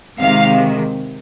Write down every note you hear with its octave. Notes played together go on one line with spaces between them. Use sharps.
C3 D#3 G#3 F5